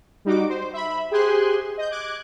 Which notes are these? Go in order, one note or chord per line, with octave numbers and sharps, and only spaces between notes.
G3 D#4 F#4 D6
C5
E5 B5
G4 G#4 C5 G#5 C6 F#6
D#5 G6
D6 F#6 G#6